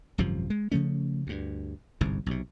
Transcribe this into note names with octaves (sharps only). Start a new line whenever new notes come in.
G#1 F#2 C3 F3
G#3
C#3 F3 A3 C#4
D2 G2
G1 C2 G#2
B1 C3